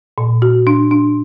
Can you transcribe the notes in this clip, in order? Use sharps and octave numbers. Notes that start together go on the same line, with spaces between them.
A#2
F#4
D4
D4